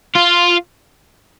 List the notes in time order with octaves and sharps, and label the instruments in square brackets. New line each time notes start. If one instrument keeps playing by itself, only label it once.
[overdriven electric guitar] F4